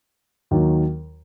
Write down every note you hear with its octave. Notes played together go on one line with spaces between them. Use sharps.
D#2 D#3 F#3